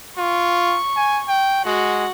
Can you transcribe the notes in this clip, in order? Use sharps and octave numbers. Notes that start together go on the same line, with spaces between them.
F4 C#6
G#5
G5
G#3 F#4 F#5